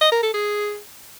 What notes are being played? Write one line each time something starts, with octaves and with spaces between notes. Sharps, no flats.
D#5
A#4
A4
G#4